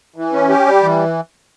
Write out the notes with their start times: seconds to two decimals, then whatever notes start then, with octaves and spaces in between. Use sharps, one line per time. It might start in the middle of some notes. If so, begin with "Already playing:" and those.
0.16 E3
0.33 C#4
0.49 G4
0.66 G3
0.83 E3